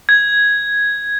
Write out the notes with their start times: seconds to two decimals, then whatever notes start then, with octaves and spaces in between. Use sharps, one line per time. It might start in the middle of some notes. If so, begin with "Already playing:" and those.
0.09 G#6